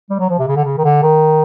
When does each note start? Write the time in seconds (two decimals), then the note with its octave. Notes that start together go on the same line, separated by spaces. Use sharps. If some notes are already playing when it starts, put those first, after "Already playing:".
0.10 G3
0.20 F#3
0.29 F3
0.39 C3
0.48 C#3
0.56 D3
0.65 C#3
0.78 D#3
0.85 D3
1.03 D#3